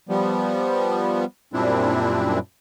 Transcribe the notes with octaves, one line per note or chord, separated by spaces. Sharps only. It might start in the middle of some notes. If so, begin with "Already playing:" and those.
F3 G3 B3
F#2 A#2 G3 C4 D4 E4